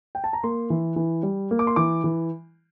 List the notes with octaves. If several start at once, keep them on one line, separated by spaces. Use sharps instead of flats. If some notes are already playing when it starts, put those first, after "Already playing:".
G5
A5
A#5
A#3 C6
E3
E3
G3
A#3
D6
C6
E3 D6
E3